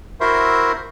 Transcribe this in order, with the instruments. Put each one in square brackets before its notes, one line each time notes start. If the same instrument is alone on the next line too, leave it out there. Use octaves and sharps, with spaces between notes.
[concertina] E4 F#4 A#4 C5 E5 C6